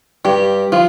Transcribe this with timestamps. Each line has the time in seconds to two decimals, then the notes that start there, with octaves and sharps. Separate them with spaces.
0.25 G2 G4
0.72 F3 F4